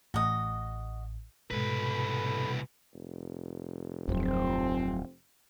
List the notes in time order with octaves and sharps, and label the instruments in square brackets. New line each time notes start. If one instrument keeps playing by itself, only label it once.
[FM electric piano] A1 [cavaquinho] F#4 D#5
[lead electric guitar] C2 B4 [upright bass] G#2 [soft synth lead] B2 [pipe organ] A4 B5
[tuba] F1
[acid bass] D1 [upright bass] F2 F#3 [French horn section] F3 C4